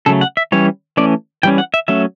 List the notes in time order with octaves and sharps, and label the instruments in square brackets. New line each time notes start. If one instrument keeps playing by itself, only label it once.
[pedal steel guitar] C#3 F#3 A3 A4
F#5
E5
E3 G3 C#4 C#5
E3 A3 C#4 D5
E3 G3 C#4 G5
F#5
E5
F#3 A3 C#4 E5